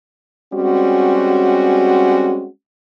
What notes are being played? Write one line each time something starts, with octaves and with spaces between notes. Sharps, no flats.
G3 G#3 C4 C#4 F#4